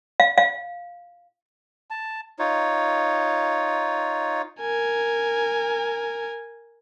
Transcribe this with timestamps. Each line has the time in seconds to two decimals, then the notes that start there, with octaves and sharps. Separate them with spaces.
0.20 F5
0.38 F5
1.90 A5
2.39 D#4 F4 C#5
4.60 A#4 G#5